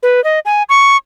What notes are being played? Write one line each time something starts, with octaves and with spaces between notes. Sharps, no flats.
B4
D#5
G#5
C#6